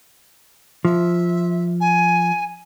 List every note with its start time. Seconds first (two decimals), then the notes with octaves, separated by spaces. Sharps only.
0.85 F3 E5
1.80 G#5